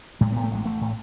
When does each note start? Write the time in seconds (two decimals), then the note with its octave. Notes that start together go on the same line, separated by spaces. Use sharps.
0.21 A2 G#3
0.32 A2 B3
0.44 A3
0.51 A1 G#3
0.65 A1 A3
0.81 A2